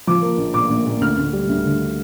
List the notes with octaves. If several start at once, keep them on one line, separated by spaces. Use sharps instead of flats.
F3 D6
A#3
A#1
A#2 D6
A#1
A#2
D2 F6
D2
G3
D2
D3